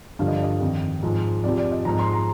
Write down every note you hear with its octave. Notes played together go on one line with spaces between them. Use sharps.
G2 D3 F3 F5
D#5
D5
D#5
F2 D#3
G#2 F3
F2 C3 F3 D5
D5
D#5
G#2 F3 A#5
C6
A#5